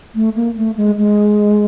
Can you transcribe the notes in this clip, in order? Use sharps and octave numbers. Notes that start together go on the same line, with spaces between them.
A3
A#3
A3
G#3
G#3